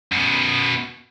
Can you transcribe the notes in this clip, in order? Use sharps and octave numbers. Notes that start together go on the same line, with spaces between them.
F#2 B2